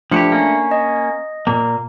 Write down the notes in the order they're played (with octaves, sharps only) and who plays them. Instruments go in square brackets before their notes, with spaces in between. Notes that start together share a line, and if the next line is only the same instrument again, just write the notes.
[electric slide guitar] F3 F#4 G4 [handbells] A3 D4 C#7
[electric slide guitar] A#3 C#4
[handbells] D#5
[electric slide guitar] A#2 A#3